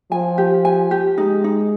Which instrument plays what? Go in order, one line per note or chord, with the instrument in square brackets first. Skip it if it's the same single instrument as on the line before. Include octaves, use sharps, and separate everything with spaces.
[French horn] F3 [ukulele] G#5
[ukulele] G4
G#5
G4
[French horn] G#3 [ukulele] D#4
[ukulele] D#4